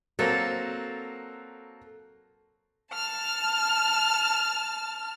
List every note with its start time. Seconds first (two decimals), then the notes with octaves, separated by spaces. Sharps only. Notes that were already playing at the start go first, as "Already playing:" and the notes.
0.19 F#3 A#3 C4 A4
2.94 A5 F6